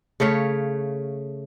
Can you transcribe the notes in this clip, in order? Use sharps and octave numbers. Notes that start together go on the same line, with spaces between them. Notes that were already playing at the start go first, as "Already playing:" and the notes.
C#3 A3 C#5 F5